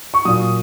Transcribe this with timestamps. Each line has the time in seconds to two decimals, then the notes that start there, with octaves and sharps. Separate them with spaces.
0.14 C#6
0.25 A#2 F#3 D#6